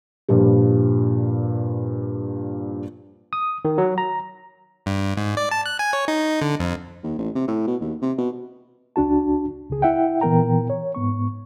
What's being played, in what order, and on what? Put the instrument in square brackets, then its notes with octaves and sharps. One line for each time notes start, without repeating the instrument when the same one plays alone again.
[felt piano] G2 A#2 F3 G3
[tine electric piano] D#6
D#3
F#3
A#5
[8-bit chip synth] G2
G#2
D5
A5
F#6
G#5
C#5
D#4
D3
F2
[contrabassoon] D#2
A1
C3
A2
B2
D#2
C3
B2
[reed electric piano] C#2 D4 F#4 A5
C#2 C#3 G#4
E4 E5 F#5 G5
A#2 E3 B3 A#4 G5 A#5
C#5
G#2 B3 C#6